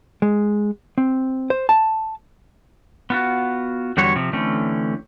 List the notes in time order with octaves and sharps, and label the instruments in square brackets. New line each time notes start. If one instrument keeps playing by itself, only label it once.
[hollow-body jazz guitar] G#3
C4
C5
A5
[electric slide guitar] B3 F4 F#4
E2 D3 G3 F#4 C#5
C3 F3
D3 E3 A3 C4 C#4